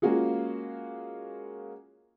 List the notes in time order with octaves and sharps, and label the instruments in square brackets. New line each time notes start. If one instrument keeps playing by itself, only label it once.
[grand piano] G#3 A#3 C#4 F4 F#4 G#4